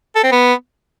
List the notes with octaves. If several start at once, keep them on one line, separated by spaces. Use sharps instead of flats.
A4
C4
B3